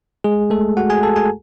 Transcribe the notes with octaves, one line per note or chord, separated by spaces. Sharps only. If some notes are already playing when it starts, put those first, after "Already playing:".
G#3 G#4
A3 A4
F#4 F#5
G#4 G#5
A4 A5
G#4 G#5